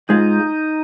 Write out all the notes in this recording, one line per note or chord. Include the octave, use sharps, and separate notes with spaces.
G#2 G#3 D#4 F4